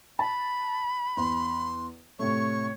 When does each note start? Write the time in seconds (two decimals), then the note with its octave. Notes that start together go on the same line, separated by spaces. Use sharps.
0.19 A5 B5
1.17 E2 C6
2.19 A2 C3 A3 C#5 C#6